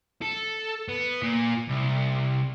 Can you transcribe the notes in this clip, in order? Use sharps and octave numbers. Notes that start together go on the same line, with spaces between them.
A4
B3
A#2
C2